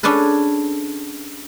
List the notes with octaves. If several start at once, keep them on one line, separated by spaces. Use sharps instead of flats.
C#4 D4 G#4 A4 B4